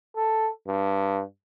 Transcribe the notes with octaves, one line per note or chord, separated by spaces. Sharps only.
A4
G2